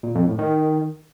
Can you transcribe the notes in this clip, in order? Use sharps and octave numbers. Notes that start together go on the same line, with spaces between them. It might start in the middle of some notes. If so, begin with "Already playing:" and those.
A#2
F2
A2
D#3